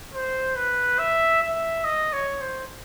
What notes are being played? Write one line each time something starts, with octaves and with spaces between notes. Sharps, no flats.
C5
B4
E5
E5
D#5
C#5
C5